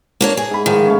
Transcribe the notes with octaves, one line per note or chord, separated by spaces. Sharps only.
A#3 D4 C#5
G#4
G#2 B5
G#2 D#3 F3
A3 C#4